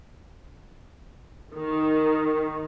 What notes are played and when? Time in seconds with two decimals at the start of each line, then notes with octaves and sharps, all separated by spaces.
1.52 D#3